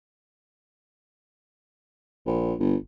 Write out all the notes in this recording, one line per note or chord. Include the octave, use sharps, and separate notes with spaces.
A#1
G1